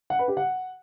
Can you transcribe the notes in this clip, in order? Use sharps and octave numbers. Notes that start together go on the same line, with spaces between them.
F#5
B4
G4
F#5